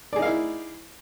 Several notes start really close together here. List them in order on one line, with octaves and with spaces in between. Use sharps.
D5 G#4 D#4 F5 E4